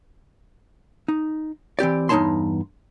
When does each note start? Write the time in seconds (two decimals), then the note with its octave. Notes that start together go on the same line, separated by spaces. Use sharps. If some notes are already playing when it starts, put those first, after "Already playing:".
1.08 D#4
1.79 E3 C4 G4 D5
2.09 E2 G2 D#4 C#5 A5 C6